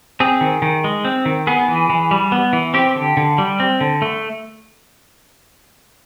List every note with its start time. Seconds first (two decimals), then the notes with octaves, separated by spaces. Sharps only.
0.20 C4 G#4
0.41 D#3
0.62 D#3
0.84 G#3
1.05 C4
1.26 D#3
1.47 B3 G#4
1.68 E3
1.90 E3
2.11 G3
2.32 B3
2.53 E3
2.74 C4 G4
2.95 D3
3.17 D3
3.38 G3
3.60 C4
3.81 D3
4.02 A3